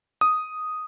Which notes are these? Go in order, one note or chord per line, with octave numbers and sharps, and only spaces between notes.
D#6